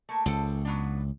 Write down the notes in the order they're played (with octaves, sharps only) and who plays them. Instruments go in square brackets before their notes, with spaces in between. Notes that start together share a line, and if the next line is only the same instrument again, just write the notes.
[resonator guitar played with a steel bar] A3 A#3
[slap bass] C#2 [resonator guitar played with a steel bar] A4 C5 G5
[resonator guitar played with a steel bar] F#3 B3 D4